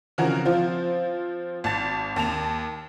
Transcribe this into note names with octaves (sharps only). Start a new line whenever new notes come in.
C#3 E3 F3 C4 F#4 A#4
F3 C4 F4 C5
G#1 A5 A6
D#2 A5 F7